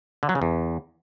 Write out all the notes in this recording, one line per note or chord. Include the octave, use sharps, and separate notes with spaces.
D3
F#3
C#3
E2